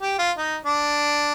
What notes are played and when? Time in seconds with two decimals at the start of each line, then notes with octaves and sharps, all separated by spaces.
0.01 G4
0.19 F4
0.37 D#4
0.65 D4